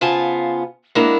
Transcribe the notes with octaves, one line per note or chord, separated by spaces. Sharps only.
C#3 B3 F4 C5 G#5 A5
G#3 A#3 B3 D4 E4 A#4